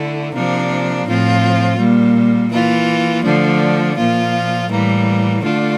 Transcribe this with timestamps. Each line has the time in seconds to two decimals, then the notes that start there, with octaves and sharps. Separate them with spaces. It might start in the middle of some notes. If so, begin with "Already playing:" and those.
Already playing: D3 A3 E4
0.33 C3 F3 A#3 D4
1.05 A2 F3 C4 F4
1.78 A#2 G3 A#3
2.50 E3 A#3 F4
3.23 D3 F3 A3 D4
3.96 A#2 F3 A#3 F4
4.68 A2 E3 G3 A#3
5.41 D3 A3 D4 F4